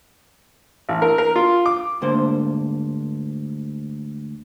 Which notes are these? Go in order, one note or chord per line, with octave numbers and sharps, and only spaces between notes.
A1
A#4
A#4
F4
D6
D2 G#2 D3 A#3 C5